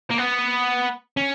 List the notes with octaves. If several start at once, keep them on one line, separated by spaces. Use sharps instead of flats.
A#3
B3
C#4